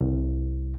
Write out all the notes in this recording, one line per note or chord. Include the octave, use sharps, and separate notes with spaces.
C2